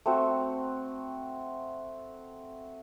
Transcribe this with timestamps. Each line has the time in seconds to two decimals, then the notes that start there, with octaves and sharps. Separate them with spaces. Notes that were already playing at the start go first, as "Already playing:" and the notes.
0.06 A3 C4 F#4